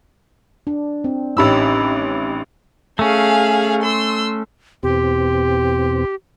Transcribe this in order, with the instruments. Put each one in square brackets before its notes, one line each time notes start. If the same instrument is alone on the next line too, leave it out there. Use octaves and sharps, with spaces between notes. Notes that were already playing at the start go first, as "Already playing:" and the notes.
[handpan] D4
C4
[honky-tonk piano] A1 B5 E6 [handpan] C#4 D#4 G4
[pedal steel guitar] A3 C#4 [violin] G#4 F5
[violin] C6 E6
[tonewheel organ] E2 B2 C4 [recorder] G4